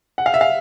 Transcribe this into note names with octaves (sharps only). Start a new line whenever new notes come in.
F#5
F5
E5
F5